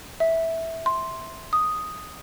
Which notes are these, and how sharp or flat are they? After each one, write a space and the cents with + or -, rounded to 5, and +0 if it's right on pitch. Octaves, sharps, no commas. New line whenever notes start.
E5 -10
C6 +5
D#6 +0